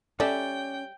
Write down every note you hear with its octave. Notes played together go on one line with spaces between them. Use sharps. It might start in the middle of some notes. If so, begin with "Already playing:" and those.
G3 C#4 A4 D5 E5 G5